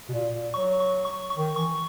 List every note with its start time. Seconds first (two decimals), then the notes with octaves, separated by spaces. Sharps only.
0.09 B2
0.13 A#2
0.34 A#2
0.54 F#3 C#6
0.80 C#6
1.05 C#6
1.30 C#6
1.37 D#3
1.56 E3 C#6